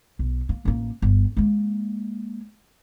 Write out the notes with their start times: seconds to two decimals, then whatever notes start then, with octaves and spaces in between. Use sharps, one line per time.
0.19 B1
0.49 A#3
0.65 A1 A#3
1.02 G1
1.37 G#3 A#3